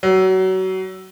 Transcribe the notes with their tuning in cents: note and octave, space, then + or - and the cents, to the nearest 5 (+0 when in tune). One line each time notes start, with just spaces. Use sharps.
F#3 +25